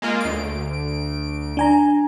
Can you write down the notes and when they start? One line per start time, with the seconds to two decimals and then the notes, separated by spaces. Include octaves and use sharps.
0.02 G#3 A#3 F4
0.21 D2 D7
1.57 D4 G#5 A#5